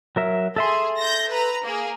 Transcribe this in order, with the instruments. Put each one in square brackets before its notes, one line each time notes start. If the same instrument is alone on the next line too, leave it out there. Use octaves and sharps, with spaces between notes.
[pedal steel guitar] F#3 A#4 E5
[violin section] G#4 [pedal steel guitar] A4 E5 C6
[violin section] G6 A#6
B4 A#5
A#3 G#4